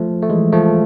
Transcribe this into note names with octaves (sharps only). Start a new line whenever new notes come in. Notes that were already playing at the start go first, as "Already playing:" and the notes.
Already playing: F3 A3
A3
E3 G#3
F3 A3